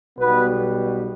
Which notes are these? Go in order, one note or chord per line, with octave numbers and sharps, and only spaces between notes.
B1 B2 G3 B3 B4